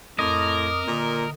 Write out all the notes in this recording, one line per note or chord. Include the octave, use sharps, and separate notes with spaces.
F2 A2 A#4 D#5 D6
A#2 D3